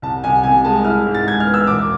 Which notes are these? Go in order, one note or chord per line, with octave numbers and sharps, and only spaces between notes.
C2 A5
C2 G#5
C3 G#5
G#3 A5
E4 F6
G#2
A6
G#3 G#6
F6
B3
E6
E1 D6